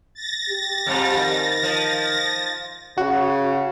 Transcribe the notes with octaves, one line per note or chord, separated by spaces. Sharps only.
A6 A#6
G4
F2 G#2 G3
D#3
F3
C#3 F#4